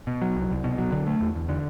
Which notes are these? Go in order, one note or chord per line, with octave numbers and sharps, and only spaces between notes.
B2
F#3
C2
C2
B2
F#3
D3
A3
E2
E2
D3